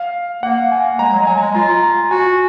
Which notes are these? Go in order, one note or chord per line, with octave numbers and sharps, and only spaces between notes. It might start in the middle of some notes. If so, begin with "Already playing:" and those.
Already playing: F5
A#3 F#5
G#5
G#3 A#5
F#3
G#3
F#3 G#5
G#3
F4 A#5
A#5
F#4 G#5